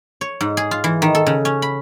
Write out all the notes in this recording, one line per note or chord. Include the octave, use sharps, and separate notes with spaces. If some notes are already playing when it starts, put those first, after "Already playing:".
C#5
G#2
G#4
F4
E3
D#3
A4
C#3
C#4
B5